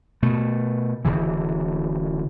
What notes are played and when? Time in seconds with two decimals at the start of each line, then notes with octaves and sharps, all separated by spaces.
0.22 B2 A3
1.05 D1 C#3 E3